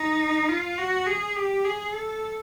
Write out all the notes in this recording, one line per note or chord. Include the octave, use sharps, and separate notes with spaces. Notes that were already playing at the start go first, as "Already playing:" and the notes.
Already playing: D#4
F4
F#4
G#4
G4
G#4
A4